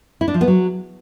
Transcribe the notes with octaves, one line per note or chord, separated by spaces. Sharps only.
E4
D4
F3
B3
F#3